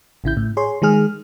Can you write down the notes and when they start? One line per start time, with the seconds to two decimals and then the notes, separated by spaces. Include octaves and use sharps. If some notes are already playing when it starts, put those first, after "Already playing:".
0.24 A1 C#3 E4 G6
0.37 A2
0.57 G#4 C#5 C6
0.82 D#3 G#3 G#4 F6